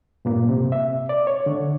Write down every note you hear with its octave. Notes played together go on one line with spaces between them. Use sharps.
G2 A#2 A#3
C3
E5
D5
C#5
D3